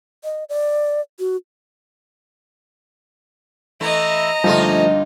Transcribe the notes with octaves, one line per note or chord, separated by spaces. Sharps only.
D#5
D5
F#4
E3 A3 E4 D#5 A#5
G2 D3 F3 A3 A#3 D#4 F4